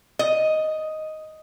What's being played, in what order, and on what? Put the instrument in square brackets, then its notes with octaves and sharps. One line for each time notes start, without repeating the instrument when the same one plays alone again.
[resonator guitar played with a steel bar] D#5